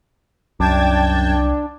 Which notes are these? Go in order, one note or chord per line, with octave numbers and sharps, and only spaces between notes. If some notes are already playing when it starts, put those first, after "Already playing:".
C2 F#2 D4 G5 A5 G#6